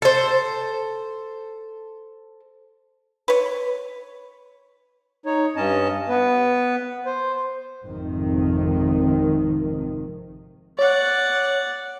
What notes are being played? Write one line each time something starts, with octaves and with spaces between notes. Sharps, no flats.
A4 C5
B4 C#5
D#4 C#5
G2 C#4 D#5 A5
B3 B4
C5
G#1 F2 C3 D#3
C#5 D5 F#5